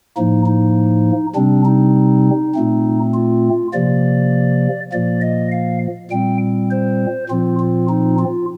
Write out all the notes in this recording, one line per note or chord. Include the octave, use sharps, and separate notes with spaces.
A2 F3 A#3 D#4
D#4
C3 G3 C4 D4
D#4
A#2 A3 C4
F4
C3 F3 A#3 D5
A#2 F3 A#3 D5
D#5
F5
A#2 G3 C4 G5
C5
A#2 F3 C4 F4
F4
D#4
F4